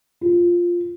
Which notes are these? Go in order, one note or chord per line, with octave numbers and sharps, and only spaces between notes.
F4